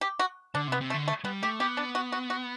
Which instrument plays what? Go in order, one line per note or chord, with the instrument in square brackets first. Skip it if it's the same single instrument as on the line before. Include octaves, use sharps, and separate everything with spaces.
[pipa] G4
F#4
[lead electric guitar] D3 [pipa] D4
[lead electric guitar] C3
[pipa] B3
[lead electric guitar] C3
[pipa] A3
[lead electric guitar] D3
[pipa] A3
[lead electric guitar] G3 [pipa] B3
[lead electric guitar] A3 [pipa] G4
[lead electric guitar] B3 [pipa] G4
[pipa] D4
F#4
F#4
F#4